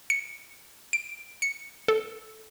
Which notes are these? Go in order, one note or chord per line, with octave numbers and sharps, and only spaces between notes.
C#7
D7
C#7
A4